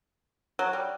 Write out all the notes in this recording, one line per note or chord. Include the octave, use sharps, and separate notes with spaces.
F#3
G3